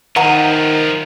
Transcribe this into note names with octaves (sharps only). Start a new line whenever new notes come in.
D#3 F3 G#4 D#5 F#5 A#5